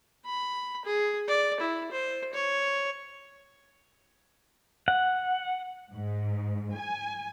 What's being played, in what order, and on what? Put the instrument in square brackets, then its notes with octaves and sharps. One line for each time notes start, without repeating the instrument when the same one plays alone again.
[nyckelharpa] B5
G#4
D5
E4
C5
C#5
[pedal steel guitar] F#5
[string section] G#2
G#5